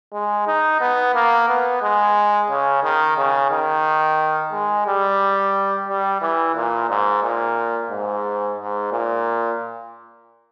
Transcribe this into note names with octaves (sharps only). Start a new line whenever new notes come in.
G#3
D#4
B3
A#3
B3
G#3
C#3
D#3
C#3
D#3
G#3
G3
G3
E3
A#2
G#2
A#2
G#2
G#2
A#2